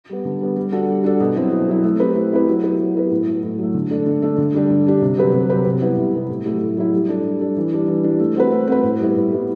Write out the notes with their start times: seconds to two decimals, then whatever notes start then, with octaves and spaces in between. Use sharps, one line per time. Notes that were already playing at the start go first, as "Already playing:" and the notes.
0.09 G3 B3
0.25 D3
0.41 G3 B3
0.56 G3
0.72 D4 F#4 A4
0.89 G3
1.04 D4 F#4 A4
1.20 B2
1.36 F#3 C4 E4
1.52 B2
1.68 F#3 C4 E4
1.84 A3
2.00 C4 E4 G4 B4
2.15 A3
2.32 C4 E4 G4 B4
2.48 F#3
2.63 B3 E4 G4 B4
2.79 F#3
2.95 B3 E4 G4 B4
3.11 A2
3.27 F#3 A3
3.43 A2
3.59 F#3 A3
3.74 D3
3.91 A3 D4 A4
4.06 D3
4.22 A3 D4 A4
4.38 D3
4.54 G3 D4 G4
4.70 D3
4.86 G3 D4 G4
5.02 C3
5.18 F#3 C4 G4 B4
5.33 C3
5.49 F#3 C4 G4 B4
5.66 C3
5.81 G3 B3 E4
5.98 C3
6.13 G3 B3 E4
6.29 A2
6.45 F#3 A3 E4 G4
6.62 A2
6.77 F#3 A3 E4 G4
6.93 G3
7.09 D4 A4
7.25 G3
7.41 D4 A4
7.57 E3
7.72 G3 D4
7.88 E3
8.04 G3 D4
8.20 A3
8.36 C4 F#4 B4
8.52 A3
8.68 C4 F#4 B4
8.83 A2
9.00 G3 B3 E4
9.16 A2
9.31 G3 B3 E4